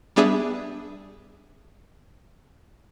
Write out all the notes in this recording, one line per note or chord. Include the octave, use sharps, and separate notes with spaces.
G3 B3 D4 G#4 E5